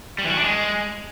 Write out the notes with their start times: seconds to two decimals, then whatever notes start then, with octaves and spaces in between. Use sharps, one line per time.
0.19 G3
0.25 E3
0.31 F#4
0.37 D4
0.43 G#3